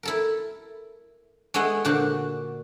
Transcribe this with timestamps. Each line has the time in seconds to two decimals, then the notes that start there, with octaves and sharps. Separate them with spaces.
0.03 E4 A4 A#4
1.54 G#3 A3 B3 E4 D#5 F#5
1.85 A#2 D3 D4 F#4 C5